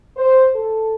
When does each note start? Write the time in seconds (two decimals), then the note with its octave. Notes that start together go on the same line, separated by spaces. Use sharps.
0.17 C5
0.55 A4